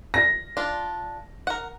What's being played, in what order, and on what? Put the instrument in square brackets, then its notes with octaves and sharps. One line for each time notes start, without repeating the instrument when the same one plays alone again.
[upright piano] A#6
[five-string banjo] D4 F4
A#4 F#5